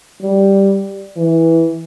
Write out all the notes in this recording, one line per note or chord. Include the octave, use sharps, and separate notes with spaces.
G3
E3